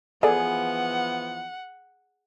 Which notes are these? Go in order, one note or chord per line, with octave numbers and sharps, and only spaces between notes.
E3 F3 B3 G#4 A4 D5 F#5